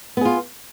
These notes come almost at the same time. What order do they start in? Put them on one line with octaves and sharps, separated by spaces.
B3 G#4 F4